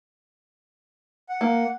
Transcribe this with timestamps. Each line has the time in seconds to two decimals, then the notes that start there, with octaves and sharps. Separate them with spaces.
1.29 F#5
1.41 A#3